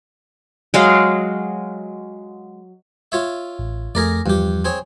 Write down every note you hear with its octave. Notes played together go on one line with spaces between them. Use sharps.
F#3 G#3 G#4 F5
F4 C#5 E5
A1
F2 A3 G#4 A#4 D5 A#6
E2 G2 F3 G4
C4 G#4 C#5